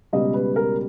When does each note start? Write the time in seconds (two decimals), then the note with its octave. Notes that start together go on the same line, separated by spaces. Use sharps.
0.13 C#2 B2 G3 D#5
0.34 B4
0.56 A#4